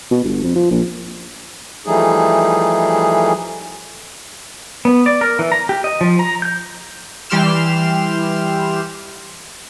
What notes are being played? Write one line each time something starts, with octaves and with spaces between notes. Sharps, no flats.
B2
G1
F2
F3
A#1
E3 F3 G3 A3 D#4 G#4
B3
D5
A#4
E3
A#5
G4
D#5
F3
A#5
G6
E3 G3 G4 C6 F6 E7